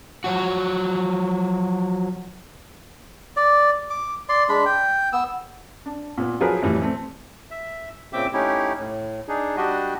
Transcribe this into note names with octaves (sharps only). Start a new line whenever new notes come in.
F3 F#3 F#4
D5
D6
D5 C6
G#3 D4 B5
G5
B3 E6
D4
A#2 B3
F3 F#3 G#4 A#4 B4
F2 A2 E3 G3
A3 C4
E5
A#2 C#3 C4 E5 G5 D6
A3 C#4 D#4 E4 G4
A2
D4 D#4 G#4
G3 D4 F#4 G4 D#5